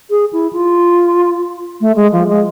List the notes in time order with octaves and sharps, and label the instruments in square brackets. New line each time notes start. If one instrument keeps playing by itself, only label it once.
[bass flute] G#4
E4
F4
A3
G#3
F3
G#3